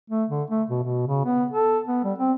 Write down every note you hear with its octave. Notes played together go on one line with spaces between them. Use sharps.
A3
D3
A3
B2
B2
C#3
B3
A4
B3
G3
C4